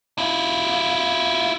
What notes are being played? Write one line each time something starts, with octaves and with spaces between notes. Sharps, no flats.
E4 F4